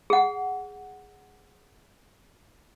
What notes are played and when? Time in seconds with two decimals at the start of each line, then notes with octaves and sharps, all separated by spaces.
0.10 G#4 F#5